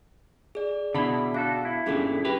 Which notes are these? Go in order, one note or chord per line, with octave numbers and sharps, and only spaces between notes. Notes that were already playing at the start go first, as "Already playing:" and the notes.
G#4 D5
B2 D3 E4 B5
D4 F#4 A4 F5
E4
G2 A#2 D3 C#4 G#4 A4
G4 B4